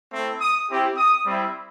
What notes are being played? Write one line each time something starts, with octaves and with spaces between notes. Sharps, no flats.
A3 C4 E4
D#6
C4 E4 G4
D#6
G3 C4 E4